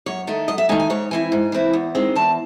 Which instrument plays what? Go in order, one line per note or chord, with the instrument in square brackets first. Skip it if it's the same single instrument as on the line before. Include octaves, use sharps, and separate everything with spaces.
[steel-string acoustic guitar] F#2 C#5
D#3 A3 D#4
F#2 D#5
E5
D#3 A3 D#4 G#5
G#5
G#2 C#5
E3 C4 E4 G#5
G#2
E3 C4 E4
E2
D#3 G#3 C4
E2 A5